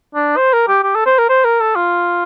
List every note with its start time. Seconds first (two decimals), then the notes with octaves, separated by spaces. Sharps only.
0.15 D4
0.37 C5
0.53 A#4
0.68 G4
0.83 G4
0.95 A4
1.06 C5
1.19 A#4
1.29 C5
1.45 A#4
1.61 A4
1.76 F4